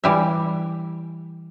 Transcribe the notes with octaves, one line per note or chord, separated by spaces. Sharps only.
E3 G3 E5